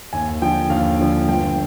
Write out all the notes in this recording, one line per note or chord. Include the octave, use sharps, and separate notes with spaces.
D#2 G#5
D3 F3 G5
D#2 F5
D3 F3
G1 G5